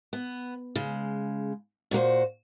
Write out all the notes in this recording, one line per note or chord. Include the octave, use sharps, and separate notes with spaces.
B3
C#3 G#3
A#2 F#4 A#4 C5